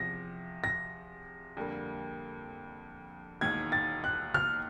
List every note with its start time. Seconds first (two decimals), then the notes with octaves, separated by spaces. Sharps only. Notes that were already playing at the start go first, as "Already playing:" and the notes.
Already playing: E2 C3 F3 A#6
0.64 A#6
1.57 F2 D3 G3 A#3
3.41 E1 D#2 D#3 G#6
3.72 A6
4.04 F#6
4.34 F6